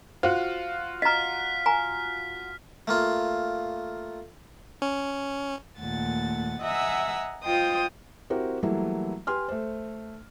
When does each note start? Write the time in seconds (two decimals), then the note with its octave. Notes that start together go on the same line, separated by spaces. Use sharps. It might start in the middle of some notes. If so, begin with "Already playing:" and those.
0.23 F4 F#4 C5
1.02 D#5 A#5 F6 B6
1.66 G#5 A#5
2.87 A3 A#3 F4
4.82 C#4
5.79 D#2 A#2 A3 F#5 A6
6.62 D#5 E5 F#5 G#5 A#5 E6
7.45 F4 C5 D#5 G5 D#6 G6
8.30 C4 E4 F#4 G4 A#4
8.63 E3 F#3 G3 A3 A#3 E4
9.27 G4 B4 G#5 C6 F6
9.48 A3 C5